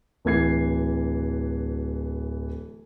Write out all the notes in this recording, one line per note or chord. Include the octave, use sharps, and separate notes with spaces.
D1 E3 G#6 C7